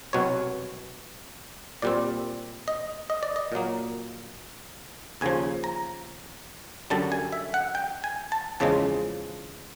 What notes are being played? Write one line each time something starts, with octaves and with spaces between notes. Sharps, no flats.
C2 B2 F#3 C#5
A#2 G3 C4 D5
D#5
D#5
D5
D#5
A#2 F#3 A#3
D#2 C#3 F3 G#5
A#5
F#2 D3 G3 A5
G#5
E5
F#5
G5
G#5
A5
E2 C#3 F3 G#3 A5